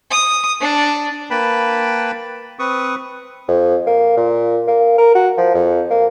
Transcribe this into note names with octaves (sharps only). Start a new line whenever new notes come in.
D#6
D4
A#3 B4 G5 A5 B5
C4 B4 C#6 D#6
F2
A#3
A#2
A#3
A#4
F#4
F3
F2
A#3